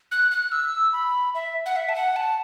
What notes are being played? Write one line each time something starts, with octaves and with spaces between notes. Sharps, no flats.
F#6
F#6
E6
B5
E5
F#5
E5
A5
F#5
A5